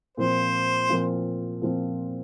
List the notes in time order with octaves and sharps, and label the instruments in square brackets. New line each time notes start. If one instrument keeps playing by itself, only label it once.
[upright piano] A#2 F3 C4 F4 [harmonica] C5
[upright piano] A#2 F3 C4 F4
A#2 F3 C4 F4